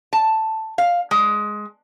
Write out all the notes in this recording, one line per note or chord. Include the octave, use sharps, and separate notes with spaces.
A5
F5
G#3